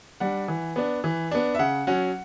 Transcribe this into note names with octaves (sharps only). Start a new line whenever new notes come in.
G3 D4 F#5
E3
B3 D4
E3
B3 D4
E5
C#3 F#5
F#3 C#4 F#5